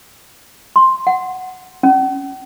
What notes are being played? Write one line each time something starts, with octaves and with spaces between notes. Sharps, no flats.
C6
F#5
C#4